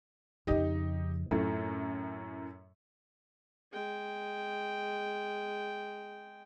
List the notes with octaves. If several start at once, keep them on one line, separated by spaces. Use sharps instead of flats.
F2 C#3 D#4 G4 D#5
F#2 A2 C4 F4
G#3 G5